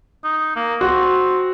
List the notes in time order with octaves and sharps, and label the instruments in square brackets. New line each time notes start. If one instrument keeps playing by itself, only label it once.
[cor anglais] D#4
A#3
[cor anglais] C4 [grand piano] F#4